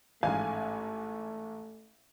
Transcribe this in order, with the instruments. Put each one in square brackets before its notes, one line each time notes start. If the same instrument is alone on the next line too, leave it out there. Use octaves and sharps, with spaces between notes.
[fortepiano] A1 G#2 [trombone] A3 [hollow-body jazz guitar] F5 [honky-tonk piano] G#5